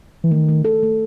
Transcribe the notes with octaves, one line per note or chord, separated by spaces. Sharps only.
E3
D#3 A3
A3
A4
A3